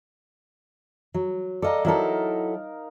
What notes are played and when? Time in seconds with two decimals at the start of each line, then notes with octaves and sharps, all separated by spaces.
1.14 F#3
1.62 A4 D5 D#5 F5 A#5
1.85 F#3 D#4 E4 A4 A#4